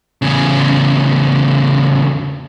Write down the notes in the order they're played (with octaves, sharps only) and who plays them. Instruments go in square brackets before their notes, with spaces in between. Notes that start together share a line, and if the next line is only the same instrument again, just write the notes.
[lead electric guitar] E2 C#3